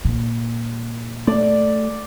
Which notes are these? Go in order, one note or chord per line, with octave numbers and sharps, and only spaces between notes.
A#2
A3 D5